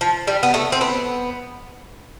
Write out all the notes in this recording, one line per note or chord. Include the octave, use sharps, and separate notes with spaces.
F3
G3
B3
A3
C4
B3